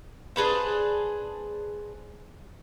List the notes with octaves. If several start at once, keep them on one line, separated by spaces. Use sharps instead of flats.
D4 G#4 B4 C5